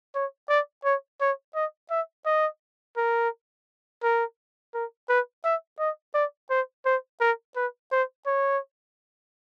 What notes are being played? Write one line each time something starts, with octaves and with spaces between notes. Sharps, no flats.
C#5
D5
C#5
C#5
D#5
E5
D#5
A#4
A#4
A#4
B4
E5
D#5
D5
C5
C5
A#4
B4
C5
C#5